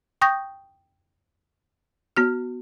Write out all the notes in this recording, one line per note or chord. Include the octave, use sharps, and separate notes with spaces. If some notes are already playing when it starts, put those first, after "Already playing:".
G5 C#6 D#6 G6 A#6
B3 F#4 F6